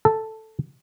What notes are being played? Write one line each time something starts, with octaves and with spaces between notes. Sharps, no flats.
A4